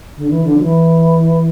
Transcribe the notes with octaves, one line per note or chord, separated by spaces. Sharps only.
D3
E3
D3
F#3
E3